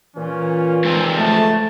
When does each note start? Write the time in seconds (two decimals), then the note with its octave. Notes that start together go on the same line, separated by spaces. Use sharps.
0.16 A#2 E3 C#4
0.85 G#2 F3 C4
1.17 A3 A5